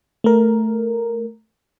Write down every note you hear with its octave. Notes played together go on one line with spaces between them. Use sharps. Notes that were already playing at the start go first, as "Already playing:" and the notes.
A3 A#4